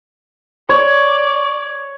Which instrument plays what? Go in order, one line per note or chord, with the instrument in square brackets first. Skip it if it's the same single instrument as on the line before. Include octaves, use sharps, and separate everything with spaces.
[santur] C#5 [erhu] D5